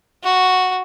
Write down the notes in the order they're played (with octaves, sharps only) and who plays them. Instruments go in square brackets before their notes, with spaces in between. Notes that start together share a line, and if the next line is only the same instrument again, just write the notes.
[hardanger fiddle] F#4